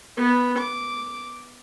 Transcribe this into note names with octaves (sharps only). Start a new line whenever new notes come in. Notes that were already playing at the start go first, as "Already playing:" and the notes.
B3
D6